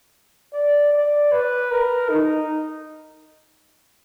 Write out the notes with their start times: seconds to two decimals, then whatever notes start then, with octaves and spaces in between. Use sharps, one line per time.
0.54 D5
0.93 D5
1.32 B4
1.71 A#4
2.09 D#4